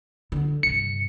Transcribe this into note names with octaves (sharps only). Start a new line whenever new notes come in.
D3 F#3
G2 C3 C#7